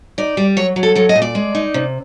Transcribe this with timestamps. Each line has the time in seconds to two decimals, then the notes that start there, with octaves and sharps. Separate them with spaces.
0.18 D#4 D5
0.37 G3
0.57 F#3 C#5
0.76 F#3
0.83 A4
0.95 F#3 A4
1.09 D#5
1.16 A#2
1.22 D5
1.35 G#3
1.55 D#4
1.74 C3